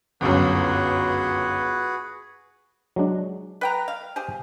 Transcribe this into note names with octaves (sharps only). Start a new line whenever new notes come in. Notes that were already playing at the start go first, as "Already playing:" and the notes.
G1 C#2 F#2 F#4 G#4 B4
F#3 G#3 D4
B4 G5 A#5
F5
G4 G#4 C5